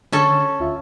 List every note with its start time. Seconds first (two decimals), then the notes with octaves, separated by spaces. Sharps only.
0.12 D3 C#4 A4
0.60 D2 F4 E5